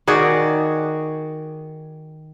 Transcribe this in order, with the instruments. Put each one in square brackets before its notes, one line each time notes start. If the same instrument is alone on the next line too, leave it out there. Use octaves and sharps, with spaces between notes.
[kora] D#3 F#4 G#4 D5